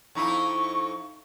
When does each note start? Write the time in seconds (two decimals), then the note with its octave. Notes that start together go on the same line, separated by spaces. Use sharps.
0.15 F2 D#4 E4 C#6